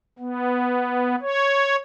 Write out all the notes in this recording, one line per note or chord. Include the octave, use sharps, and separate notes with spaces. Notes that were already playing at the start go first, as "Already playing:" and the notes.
B3
C#5